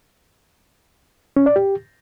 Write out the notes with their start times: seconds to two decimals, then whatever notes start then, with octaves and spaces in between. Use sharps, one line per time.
1.36 C#4
1.46 D5
1.56 G4